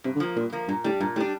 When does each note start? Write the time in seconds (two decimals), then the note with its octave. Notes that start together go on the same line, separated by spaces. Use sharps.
0.04 G2 C3
0.15 D3
0.20 F3 A#3
0.36 G2 A#2
0.53 F3 A#3
0.68 G2 A#2
0.84 A2 G3 D4
1.00 G2 A#2
1.16 A2 G3
1.20 D4